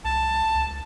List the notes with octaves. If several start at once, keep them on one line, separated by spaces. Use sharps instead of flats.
C2 A5
C#2